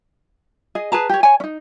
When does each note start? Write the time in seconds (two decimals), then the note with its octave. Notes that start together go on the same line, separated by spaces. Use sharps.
0.75 G#4 D#5
0.92 G#4 B4 A5 A#5
1.09 G4 C#5
1.23 C#5 G#5
1.40 C#4 D#4